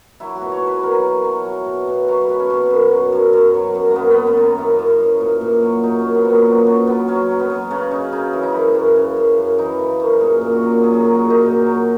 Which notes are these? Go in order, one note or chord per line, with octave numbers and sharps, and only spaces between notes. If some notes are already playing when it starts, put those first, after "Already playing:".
F#3 E4
F#4
B2
C#5
B2 B4
F#3 A#4
F#3
F#3
F#3
B2
B2
F#3 C#5
B4
B2
C#4
B2
F#2
F#3
F#2
F#2
F#3
F#2
F#2 A#3 B3
B3
F#2
B3
D#3
F#2 E4
F#2
F#2
A#2
A#2
F#3
A#2 D#4
A#2 C#4
B3
A#2
B3
F#3
F#3 C#4
F#3 B3
F#3 C#4
F#3
B3
F#3
C#3 C#4
C#3 D#4
C#3 D#4
E3 E4
D#4
F#2 E4
F#2
C#3
F#2
F#2
E3 D#4
C#3
F#2
A#2 G#4
A#2
F#4
F#3
F#3 G#4
G#4
F#3 A#4
F#4
A#2
D#4
A#2
F#3